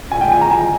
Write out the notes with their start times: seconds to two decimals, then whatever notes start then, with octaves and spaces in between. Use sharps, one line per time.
0.12 G#5
0.21 G5
0.32 G#5
0.41 A#5
0.50 G#5